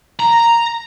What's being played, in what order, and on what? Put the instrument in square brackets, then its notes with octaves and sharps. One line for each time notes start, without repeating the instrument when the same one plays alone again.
[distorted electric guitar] A#5